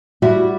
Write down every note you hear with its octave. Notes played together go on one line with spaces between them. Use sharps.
G3 E4 F#4